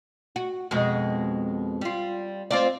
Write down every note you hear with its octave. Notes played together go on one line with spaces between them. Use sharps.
F#4
F2 B2 G#3
G3 F4
C4 F4 D5